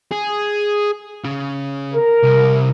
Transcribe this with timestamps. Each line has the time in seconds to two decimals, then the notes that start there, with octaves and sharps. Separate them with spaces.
0.11 G#4
1.24 C#3
1.92 A#4
2.24 C2